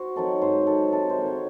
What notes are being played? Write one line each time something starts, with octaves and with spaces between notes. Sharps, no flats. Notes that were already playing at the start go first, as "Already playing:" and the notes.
Already playing: F#4 C5
D#3 F#3 C4 A4
G#2 C5
D#3 F#3 C4 A4
C3 A4
C5
D#3 G#3
C#5